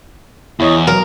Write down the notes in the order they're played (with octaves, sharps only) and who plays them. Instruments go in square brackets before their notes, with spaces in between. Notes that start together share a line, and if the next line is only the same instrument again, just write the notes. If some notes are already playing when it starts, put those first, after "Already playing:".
[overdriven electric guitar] E2 [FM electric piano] E4 C#5 D#5
[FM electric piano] F#3 [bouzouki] A#4